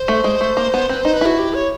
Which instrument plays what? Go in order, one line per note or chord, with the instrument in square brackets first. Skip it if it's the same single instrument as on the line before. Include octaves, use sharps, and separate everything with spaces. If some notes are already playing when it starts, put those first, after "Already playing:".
Already playing: [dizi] C5
[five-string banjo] A3
G#3
A3
A#3
B3
[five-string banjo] C4 [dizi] B4
[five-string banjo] D#4 [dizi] C5
[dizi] B4
[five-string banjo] E4 [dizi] F#4
[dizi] G4
C#5